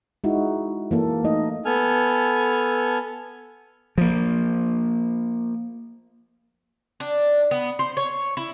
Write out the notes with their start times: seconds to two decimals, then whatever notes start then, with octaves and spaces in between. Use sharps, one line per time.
0.24 G#3 D#4 E4 F#4
0.91 E3 A#3 A4
1.24 A3 D#4 D#5
1.65 B3 A4 G#5 F6
3.98 F3 A#3
7.00 D4
7.51 B3
7.79 C5
7.97 C#5
8.37 E4